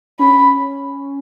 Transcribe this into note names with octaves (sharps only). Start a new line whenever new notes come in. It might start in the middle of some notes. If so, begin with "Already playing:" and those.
C#4 B5